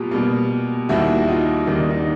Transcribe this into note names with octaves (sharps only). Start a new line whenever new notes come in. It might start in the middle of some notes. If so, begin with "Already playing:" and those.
Already playing: B2 G3 A#3 F4 G4
B2 G3 A#3
D#2 D#3 G3 A#3 E4 F#4
F#4
D#4 F4
D#2 D#3 G3 A#3 D#4
D4
D#4